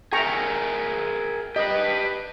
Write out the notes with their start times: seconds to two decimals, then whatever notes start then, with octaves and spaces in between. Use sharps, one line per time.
0.13 G#4 A#4 E5 G5 A#5 C#6
1.56 G4 B4 D#5